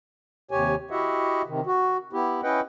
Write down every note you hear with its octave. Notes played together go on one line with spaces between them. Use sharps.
D#2 C3 G4 C#5 G#5
E4 F#4 G4 D#5 E5 F#5
C3 D#3
F#4
B3 E4 G4
C#4 E4 B4 D#5 F#5 G5